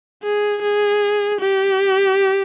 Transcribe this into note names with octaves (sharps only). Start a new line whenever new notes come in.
G#4
G#4
G4